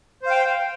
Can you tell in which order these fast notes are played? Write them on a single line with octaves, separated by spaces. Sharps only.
C5 F5 G5